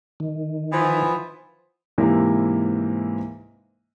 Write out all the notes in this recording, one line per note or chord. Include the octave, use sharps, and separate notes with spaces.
D#3
E3 F3 B3
G#2 C3 E3 A#3 E4